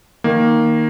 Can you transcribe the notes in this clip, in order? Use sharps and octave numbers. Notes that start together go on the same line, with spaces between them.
D#3 A#3